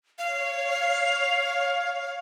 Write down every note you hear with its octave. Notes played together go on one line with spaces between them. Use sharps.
C#5 F5